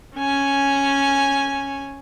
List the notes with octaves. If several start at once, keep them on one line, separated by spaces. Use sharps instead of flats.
C#4 G#5